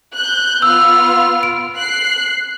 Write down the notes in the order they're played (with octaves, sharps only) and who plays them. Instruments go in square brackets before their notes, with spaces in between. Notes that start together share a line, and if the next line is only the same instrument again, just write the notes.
[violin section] F#6 G6
[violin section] B3 F4 F6 [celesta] E6
[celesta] D7
[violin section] F#6 C7